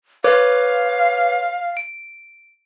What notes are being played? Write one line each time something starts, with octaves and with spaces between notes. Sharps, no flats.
B4 C#5 F5 D6
D7